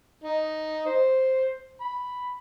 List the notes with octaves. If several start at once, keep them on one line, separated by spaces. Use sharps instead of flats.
D#4
C5
B5